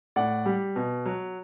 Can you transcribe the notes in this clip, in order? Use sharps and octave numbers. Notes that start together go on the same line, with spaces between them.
A2 D5 F#5
G3
B2
F#3